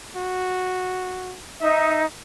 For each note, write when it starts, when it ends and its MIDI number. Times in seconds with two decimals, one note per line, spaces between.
0.16 1.35 66
1.61 2.04 63
1.61 2.02 76